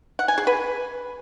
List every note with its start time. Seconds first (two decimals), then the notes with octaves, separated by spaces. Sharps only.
0.19 F#5
0.28 G#5
0.38 G#4
0.47 B4